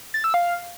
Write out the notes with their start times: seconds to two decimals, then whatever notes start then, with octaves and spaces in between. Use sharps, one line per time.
0.14 A6
0.24 E6
0.34 F5